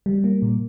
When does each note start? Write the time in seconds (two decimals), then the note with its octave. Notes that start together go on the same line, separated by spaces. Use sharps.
0.06 G3
0.24 A#3
0.42 A#2